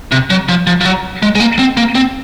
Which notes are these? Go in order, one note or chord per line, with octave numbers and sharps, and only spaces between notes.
C3
F#3
F3
F3
F3
F#3
G#3
G#3
A#3
C4
A#3
C4